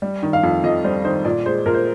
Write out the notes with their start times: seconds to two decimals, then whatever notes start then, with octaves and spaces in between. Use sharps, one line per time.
0.02 G3
0.23 D#3
0.33 F5
0.44 F2
0.64 F2 D#5
0.84 G3 C5
1.05 D#3 C5
1.25 A#2 D5
1.46 G#3 C5
1.66 A#2 A#4
1.74 C5